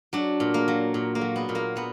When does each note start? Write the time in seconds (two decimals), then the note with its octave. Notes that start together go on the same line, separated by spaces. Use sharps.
0.13 F#3 D4
0.40 A#2
0.54 A#3
0.68 F#3
0.94 A#2
1.15 A#3
1.21 F#3
1.36 B3
1.49 A#2
1.55 A#3
1.76 F#3 B3